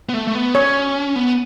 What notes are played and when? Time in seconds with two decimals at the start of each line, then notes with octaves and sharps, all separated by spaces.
0.09 B3
0.14 A3
0.27 A3
0.35 B3
0.55 C#4 C#5
1.16 B3